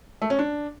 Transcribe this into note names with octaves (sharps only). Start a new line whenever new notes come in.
A3
C#4
D4